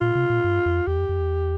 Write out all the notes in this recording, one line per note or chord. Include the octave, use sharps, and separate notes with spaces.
A#2 F4
C3
A#2
G2
F2
E2 G4
F2
F2
E2